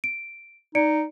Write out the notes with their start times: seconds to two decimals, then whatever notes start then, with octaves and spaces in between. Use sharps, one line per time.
0.04 D7
0.75 D#4 D5 C#7 D7